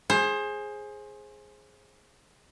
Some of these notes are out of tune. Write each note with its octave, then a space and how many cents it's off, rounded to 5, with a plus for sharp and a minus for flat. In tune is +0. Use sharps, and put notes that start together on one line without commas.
G#4 +5 C5 +25